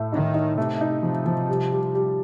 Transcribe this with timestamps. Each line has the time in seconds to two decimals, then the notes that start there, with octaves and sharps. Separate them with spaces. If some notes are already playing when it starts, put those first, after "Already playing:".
Already playing: A2 A3
0.12 D#3 D#4
0.34 D#4
0.58 C3 A3
0.81 D#4
1.03 C3 F3
1.26 F3
1.49 G3
1.72 G3
1.95 G3